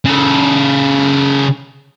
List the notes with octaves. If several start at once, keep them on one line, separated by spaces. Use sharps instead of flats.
C#3 A4